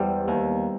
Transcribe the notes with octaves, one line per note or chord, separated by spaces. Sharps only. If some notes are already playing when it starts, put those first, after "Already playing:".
Already playing: E2 G3 C5
D#2